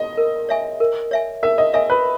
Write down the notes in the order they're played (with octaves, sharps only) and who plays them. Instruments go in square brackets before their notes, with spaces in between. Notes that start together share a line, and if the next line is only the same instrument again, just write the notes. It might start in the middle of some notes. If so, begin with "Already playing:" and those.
Already playing: [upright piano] D#5
[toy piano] A#4
C#5 E5 G#5
A#4
C#5 E5 G#5
[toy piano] A#4 [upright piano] E5
[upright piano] D#5
[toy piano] C#5 E5 G#5 [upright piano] D#5
[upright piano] B4